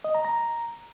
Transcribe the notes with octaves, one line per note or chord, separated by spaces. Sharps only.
D#5
A#5
A#5